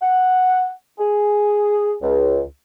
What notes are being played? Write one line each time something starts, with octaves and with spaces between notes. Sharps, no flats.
F#5
G#4
C#2